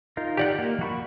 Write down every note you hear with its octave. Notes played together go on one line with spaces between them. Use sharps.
D#4 F4 A#4
G4 D5 F#5
A#3
F#4 B5 C#6